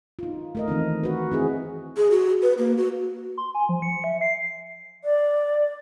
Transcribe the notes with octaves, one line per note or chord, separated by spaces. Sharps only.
D#4 F4
A3 A#4 D#5
D#3 E3 C4 D#4
F#4 B4
C4 E4 G#4
G#4
F#4
B4
A#3
F#4
C6
G#5
F3
C#7
E5
C7
D5